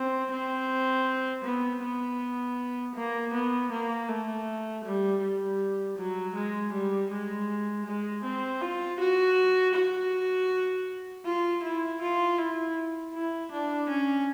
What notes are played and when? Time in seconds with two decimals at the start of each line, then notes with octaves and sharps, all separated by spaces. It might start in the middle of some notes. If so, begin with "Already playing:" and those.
Already playing: C4
0.31 C4
1.44 B3
1.82 B3
2.95 A#3
3.33 B3
3.71 A#3
4.08 A3
4.84 G3
5.21 G3
5.97 F#3
6.34 G#3
6.72 G3
7.10 G#3
7.85 G#3
8.23 C4
8.61 F4
8.99 F#4
9.74 F#4
11.25 F4
11.63 E4
12.01 F4
12.38 E4
13.14 E4
13.51 D4
13.89 C#4